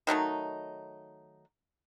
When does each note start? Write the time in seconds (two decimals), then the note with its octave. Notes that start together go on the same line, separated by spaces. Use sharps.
0.07 D#3 F#3 A3 D#4